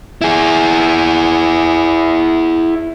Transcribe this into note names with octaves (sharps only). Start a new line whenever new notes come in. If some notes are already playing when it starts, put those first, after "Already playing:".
E4 G#4